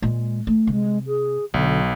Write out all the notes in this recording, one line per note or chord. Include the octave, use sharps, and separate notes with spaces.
A#2 G#3
A3
C3 G#3
G#4
B1 D3 F#3